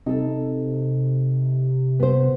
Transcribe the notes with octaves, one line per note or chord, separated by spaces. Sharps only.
C3 D#4 A4
B3 C5